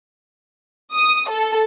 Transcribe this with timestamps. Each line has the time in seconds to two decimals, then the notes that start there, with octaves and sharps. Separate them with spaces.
0.93 D#6
1.30 A4